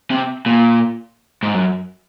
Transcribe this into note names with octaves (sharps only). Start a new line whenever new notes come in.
C3
A#2
G#2
F#2